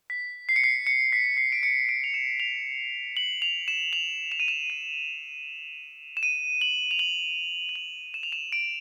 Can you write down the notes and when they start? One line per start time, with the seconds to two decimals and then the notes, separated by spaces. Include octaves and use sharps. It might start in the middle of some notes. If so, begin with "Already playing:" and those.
0.10 B6
0.49 C7
0.56 C#7
0.64 C7
0.87 C#7
1.13 B6
1.37 C7
1.52 D7
1.63 C#7
1.89 D7
2.04 F7
2.14 E7
2.40 F7
3.17 F#7
3.42 F7
3.68 E7
3.93 F7
4.32 E7
4.40 D#7
4.48 E7
4.70 D#7
6.17 E7
6.23 D#7
6.61 F#7
6.91 F7
6.99 F#7
7.69 F7
7.76 F#7
8.14 E7
8.23 F7
8.32 E7
8.52 D7